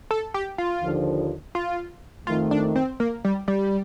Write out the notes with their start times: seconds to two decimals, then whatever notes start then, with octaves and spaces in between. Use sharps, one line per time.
0.11 A4
0.34 G4
0.58 F4
0.82 D#2 D3 F3
1.55 F4
2.27 F2 D#3 A3 F4
2.51 D4
2.76 C4
3.00 A#3
3.25 G3
3.48 G3